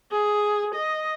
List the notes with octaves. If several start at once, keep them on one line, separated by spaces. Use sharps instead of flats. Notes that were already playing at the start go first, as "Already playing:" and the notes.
G#4
D#5